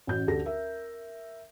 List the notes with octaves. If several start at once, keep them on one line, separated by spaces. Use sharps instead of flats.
A1 C#4 F#4 G6
D2 G4 A4 A#6
A#4 E5